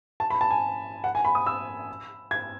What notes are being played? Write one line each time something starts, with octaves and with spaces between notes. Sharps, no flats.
A5
B5
A5
G#5
F#5
G#5
B5
D#6
E6
G#6